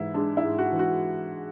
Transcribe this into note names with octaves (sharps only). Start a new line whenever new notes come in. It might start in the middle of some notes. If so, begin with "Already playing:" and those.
Already playing: G#2 E3 E4
G#3 D4
E4
G#2
F#4
E3
F#4